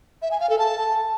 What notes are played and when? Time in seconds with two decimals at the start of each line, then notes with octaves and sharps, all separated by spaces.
0.22 E5
0.31 G#5
0.40 F5
0.49 A4
0.59 A5